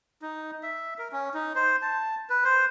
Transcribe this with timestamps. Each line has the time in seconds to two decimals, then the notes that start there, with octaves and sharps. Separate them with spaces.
0.22 D#4
0.63 E5
0.99 A#4
1.12 C#4
1.34 D#4
1.56 C5
1.82 A5
2.30 B4
2.44 C5